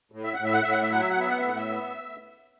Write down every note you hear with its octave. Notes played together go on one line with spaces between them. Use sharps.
A2
E5
A2 F#5
E5
F#5
A2 E5
F#5
E5
F#3 F#5
E5
F#5
B3 E5
F#5
E5
A2 F#5
E5
B3